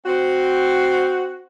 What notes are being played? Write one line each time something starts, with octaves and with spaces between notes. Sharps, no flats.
C4 F#4